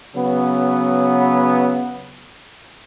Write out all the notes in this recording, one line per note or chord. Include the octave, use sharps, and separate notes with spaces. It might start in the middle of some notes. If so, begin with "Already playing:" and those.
C#3 F#3 B3